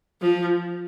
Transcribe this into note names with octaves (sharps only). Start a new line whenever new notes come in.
F3